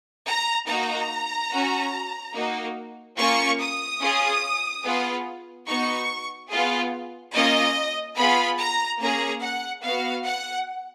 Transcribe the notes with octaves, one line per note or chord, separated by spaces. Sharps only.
A#5
A#3 D#4 F#4 A#5
C#4 F#4
A#3 D#4 F#4
A#3 C#4 F4 C#6
D#6
C#4 F4 G#4
B3 F4 G#4
B3 D#4 F#4 C#6
B3 F4 G#4
A#3 C#4 F4 D#5
B3 F4 G#4 B5
A#5
A#3 C#4 G#4 A#5
F#5
B3 F#4 F5
F#5